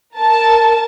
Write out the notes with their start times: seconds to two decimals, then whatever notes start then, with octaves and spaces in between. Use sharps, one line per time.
0.16 A#4 A5